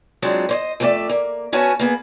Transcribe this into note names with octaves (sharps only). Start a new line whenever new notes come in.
F#3 G#3 C4 D4 F4
C5 C#5 D#5
F2 A3 D#4 F#4 D5 E5
A#3
B3 C#4 F#4 C#5 G#5 A5
A#3 B3 G#4